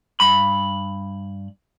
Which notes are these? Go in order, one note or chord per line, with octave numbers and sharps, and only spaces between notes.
G2 B5